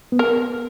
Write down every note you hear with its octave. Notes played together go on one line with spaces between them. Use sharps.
B3
A#4